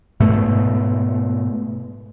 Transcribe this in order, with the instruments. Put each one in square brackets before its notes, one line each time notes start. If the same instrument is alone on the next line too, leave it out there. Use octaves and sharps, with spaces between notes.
[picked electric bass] G#2 B2 A3